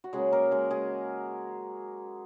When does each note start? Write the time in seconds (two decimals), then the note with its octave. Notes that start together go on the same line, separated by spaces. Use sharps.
0.04 F#4
0.13 C#3 F#3 G#3 A#3 G#4
0.32 A#3 A#4
0.51 G#3 G#4
0.71 G#3 G#4